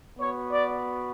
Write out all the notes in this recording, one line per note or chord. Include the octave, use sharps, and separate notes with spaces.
B3 F#4 C#5
D5